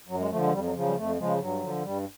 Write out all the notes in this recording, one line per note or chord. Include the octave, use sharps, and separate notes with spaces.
F#2 F#3
G#3
D3 F3 A3
G#3
F2 G3
F#3
C#3 F3
F#3
G3
F2 A3
C#3 F3 G#3
G2 F#3
D3 F3
G2 G3